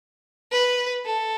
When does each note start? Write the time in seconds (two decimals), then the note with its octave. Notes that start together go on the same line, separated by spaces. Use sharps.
0.52 B4
1.06 A4